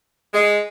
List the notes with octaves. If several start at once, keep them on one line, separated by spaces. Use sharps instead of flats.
G#3